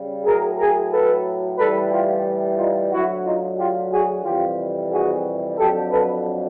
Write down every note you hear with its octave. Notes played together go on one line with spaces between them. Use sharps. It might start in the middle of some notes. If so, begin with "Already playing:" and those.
Already playing: C#3 G3
A2 F#3 G#4 A#4
G#4 A#4
A4 B4
A2 E3 G3 A4 B4
F4 G4
D#4 F4
D2 D3 F#3 E4 F#4
D#4 F4
F4 G4
F#4 G#4
F2 C3 E3 G3 F4 G4
F#4 G#4
F2 D3 F#3 G4 A4
A4 B4